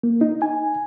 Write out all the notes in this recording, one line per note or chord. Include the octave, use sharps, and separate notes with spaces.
A#3
D#4
G#5